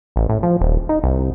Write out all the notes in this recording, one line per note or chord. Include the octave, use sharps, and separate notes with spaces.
A1
A2
F3
D#1
D#4
C2